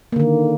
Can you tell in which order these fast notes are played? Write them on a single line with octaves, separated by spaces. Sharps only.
A#3 D3 D#3